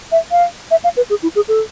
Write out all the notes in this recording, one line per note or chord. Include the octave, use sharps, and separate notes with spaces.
E5
F5
E5
F5
B4
G#4
E4
G#4
A4